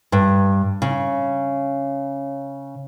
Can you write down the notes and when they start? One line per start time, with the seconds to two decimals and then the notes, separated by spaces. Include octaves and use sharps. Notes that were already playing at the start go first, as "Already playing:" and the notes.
0.12 G2
0.82 C#3